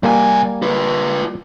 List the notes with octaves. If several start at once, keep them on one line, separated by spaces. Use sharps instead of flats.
C2 G3 A#3 G#5
F4 B4